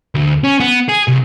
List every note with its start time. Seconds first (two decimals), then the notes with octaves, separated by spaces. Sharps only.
0.15 D2
0.44 C#4
0.60 B3
0.89 G#4
1.08 C2